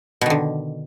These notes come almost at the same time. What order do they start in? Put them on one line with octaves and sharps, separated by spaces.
B2 D#3 D3